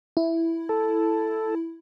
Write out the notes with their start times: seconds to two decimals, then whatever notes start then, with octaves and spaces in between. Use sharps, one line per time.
0.17 E4
0.69 A4